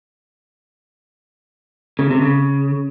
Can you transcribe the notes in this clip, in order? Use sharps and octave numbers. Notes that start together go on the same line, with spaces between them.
C#3
C3
C#3